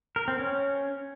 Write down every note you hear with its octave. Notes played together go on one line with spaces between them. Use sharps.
A#4
C4
C#4